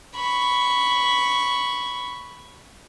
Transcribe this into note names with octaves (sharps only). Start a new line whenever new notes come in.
B5 C#6